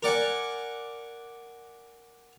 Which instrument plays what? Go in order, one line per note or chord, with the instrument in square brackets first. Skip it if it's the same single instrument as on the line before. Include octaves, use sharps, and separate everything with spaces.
[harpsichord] A#4 D5 F#5 G#5